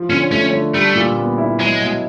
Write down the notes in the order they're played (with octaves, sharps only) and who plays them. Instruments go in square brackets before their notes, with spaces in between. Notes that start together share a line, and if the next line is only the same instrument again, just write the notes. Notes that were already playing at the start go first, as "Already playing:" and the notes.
Already playing: [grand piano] F3
[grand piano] D3 [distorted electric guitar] C#4
[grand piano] A3 [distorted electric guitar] C#4
[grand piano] D3
[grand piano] G3 [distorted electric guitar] A3
[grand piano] A#2
B3
E4
[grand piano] F#3 [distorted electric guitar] G#3
[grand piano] B2